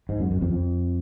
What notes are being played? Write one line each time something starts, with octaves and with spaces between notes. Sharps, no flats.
G#2
F#2
F#2
F2
F2